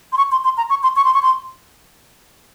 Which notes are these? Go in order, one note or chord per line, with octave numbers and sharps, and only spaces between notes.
C6
C#6
C6
C6
A#5
C#6
C6
C#6
C6
C#6
C6